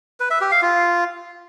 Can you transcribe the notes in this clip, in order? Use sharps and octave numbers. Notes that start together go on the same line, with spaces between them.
B4
E5
G4
F5
F4